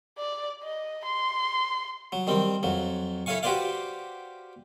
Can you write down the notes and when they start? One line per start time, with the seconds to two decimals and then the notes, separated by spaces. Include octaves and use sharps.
0.18 D5
0.64 D#5
1.06 C6
2.12 F#3
2.27 D#3 G3 C4
2.63 F2 F#3
3.26 E4 A4 C#5 F5 G#5 C#6
3.43 F#4 G4 B4 C5 D5 F5